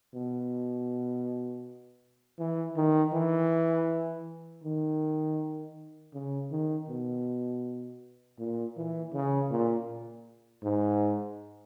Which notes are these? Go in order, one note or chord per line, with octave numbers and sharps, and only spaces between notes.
B2
E3
D#3
E3
D#3
C#3
D#3
B2
A#2
E3
C#3
A#2
G#2